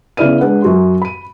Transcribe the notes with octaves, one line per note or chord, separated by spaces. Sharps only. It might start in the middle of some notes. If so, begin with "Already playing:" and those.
C#3 B3 E4 D5 F6 D#7
G#3 D4 B4 F#5
F#2 F#4 C6
B5 D#7